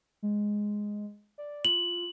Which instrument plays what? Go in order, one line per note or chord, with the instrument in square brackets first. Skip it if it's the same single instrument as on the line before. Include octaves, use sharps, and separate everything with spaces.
[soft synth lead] G#3
D5
[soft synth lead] F4 [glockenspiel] F#7